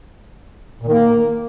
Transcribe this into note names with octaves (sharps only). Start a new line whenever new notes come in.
A#2
D#3
A#3